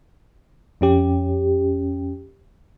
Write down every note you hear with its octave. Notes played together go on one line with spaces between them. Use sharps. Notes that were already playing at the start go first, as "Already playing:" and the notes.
F2 C#4 G4